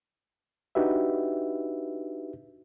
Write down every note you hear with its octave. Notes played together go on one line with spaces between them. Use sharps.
D4 D#4 F#4 G4 B4 E5